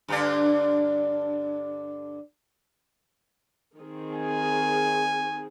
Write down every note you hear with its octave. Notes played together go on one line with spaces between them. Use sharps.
G2 D3 D4
D#3 C4 G#4
G#5